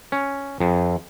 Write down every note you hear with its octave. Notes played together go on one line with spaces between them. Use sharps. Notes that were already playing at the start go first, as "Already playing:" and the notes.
C#4
F2